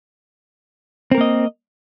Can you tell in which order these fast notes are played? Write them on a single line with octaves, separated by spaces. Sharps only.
C4 A#4 A#3 D#5